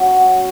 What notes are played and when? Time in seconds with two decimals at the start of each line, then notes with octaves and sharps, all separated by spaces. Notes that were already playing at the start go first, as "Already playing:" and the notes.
Already playing: F#3 C#4 F#4 D#5 F#5